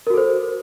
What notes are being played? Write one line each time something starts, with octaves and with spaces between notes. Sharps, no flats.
F#4 A4 A#4 C5